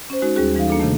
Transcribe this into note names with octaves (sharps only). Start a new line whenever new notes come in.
C#4 C5
G#3 D#4 F#4
D#2 G3 C#4 F#4 G#4
E3 G3 D#4 F5
A#3 D4 A4
C3 D#3 A3